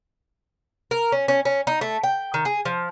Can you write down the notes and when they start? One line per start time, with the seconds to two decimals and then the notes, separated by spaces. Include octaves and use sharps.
0.91 A#4
1.12 C#4
1.28 C#4
1.45 C#4
1.67 D#4
1.81 A3
2.03 G5
2.34 D#3
2.45 G#4
2.65 F3